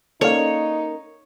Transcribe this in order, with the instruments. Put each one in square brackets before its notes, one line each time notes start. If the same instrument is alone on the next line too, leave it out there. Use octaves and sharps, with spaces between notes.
[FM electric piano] A#3 C#4 A#4 [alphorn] D#4 [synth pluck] A4 D5 F5 [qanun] C#5